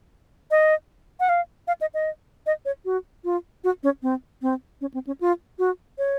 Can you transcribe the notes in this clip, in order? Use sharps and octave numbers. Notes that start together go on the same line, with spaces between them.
D#5
F#5
F5
F5
D#5
D#5
D#5
C#5
F#4
F4
F#4
C#4
C4
C4
C#4
C4
C#4
F4
F#4
C#5